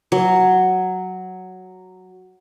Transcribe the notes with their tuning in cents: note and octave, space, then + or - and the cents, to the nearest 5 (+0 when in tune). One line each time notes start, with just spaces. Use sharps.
F#3 +0